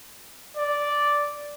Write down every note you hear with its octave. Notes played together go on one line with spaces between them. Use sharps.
D5